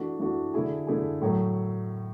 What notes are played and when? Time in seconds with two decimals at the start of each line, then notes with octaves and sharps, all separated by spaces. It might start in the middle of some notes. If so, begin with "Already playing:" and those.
Already playing: E3 A3 D4 F#4
0.19 E3 A3 D4 F#4
0.54 D3 A3 E4 G#4
0.87 D3 A3 E4 G#4
1.21 A2 F#3 A3